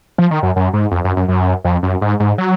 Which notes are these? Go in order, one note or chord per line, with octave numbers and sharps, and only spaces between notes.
F3
D#3
F#2
F#2
G#2
F2
F#2
F#2
F#2
F2
F#2
G#2
G#2
F#3